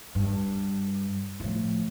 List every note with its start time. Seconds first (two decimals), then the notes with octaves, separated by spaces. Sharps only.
0.15 G2
1.40 A2 F3